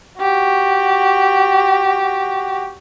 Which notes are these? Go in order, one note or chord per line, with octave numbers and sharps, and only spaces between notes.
F#4 G4